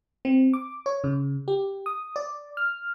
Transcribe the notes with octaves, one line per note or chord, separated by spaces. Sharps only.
C4
D6
C#5
C#3
G4
D#6
D5
F6